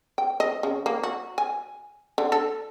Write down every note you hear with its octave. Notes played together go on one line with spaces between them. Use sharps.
G5
D#5
C#3
A#3
F#4
G#5
D3
A4